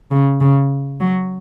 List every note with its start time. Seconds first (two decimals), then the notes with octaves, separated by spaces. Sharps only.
0.11 C#3
0.41 C#3
1.00 F#3